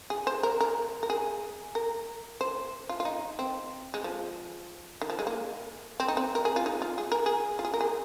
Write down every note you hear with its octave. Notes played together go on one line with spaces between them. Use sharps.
G#4
C5
A#4
A#4
A#4
G#4
A#4
C5
F4
F4
D#4
C4
G#3
F3
D#3
F3
G#3
A#3
C4
D#4
C4
A#4
G#4
F4
D#4
F4
G#4
A#4
G#4
F4
G#4
A#4
G#4